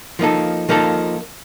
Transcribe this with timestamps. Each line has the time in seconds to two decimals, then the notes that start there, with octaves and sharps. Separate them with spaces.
0.19 F3 A#3 D#4 A4
0.69 F3 A#3 D#4 A4